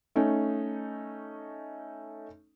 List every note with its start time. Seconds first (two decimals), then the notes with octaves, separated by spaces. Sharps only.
0.16 A3 C#4 D#4